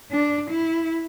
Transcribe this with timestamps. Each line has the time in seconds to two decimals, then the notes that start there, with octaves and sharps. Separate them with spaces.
0.12 D4
0.51 E4